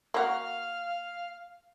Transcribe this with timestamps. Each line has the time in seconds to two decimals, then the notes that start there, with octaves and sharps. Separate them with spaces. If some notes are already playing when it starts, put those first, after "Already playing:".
0.14 A#3 F#4 F5